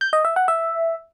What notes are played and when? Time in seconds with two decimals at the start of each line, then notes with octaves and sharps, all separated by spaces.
0.01 G6
0.13 D#5
0.25 E5
0.36 F#5
0.48 E5